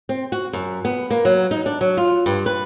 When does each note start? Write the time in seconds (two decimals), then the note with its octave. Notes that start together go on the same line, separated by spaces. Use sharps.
0.09 C4
0.32 F#4
0.53 F#2
0.85 B3
1.11 A#3
1.25 F#3
1.51 D#4
1.66 D4
1.81 F#3
1.97 F4
2.26 G2
2.46 B4